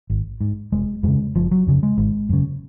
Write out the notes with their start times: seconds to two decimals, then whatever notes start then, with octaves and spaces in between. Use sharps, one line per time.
0.10 G#1
0.41 G#2
0.72 F1 G#3
1.03 F2 C#3 G#3
1.35 F#1 F3
1.51 F#3
1.67 F2 C#3
1.83 G#3
1.97 G#1
2.29 F#2 C#3